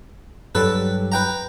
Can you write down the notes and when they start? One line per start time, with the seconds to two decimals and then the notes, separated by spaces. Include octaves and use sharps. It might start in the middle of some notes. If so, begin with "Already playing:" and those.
0.55 G2 F#3 G3 A4 B4
1.12 B4 G5 A#5